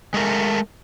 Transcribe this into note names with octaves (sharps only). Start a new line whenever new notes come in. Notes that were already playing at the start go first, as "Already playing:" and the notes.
G#3 A3 A#4